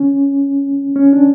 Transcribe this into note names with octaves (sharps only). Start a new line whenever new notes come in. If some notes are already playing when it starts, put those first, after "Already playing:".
Already playing: C#4
C#4
D4